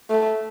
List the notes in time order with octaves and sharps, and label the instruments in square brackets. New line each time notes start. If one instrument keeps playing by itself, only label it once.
[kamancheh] A3